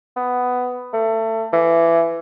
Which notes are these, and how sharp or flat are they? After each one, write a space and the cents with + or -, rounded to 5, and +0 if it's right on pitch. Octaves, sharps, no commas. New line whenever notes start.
B3 +10
A3 +25
E3 +20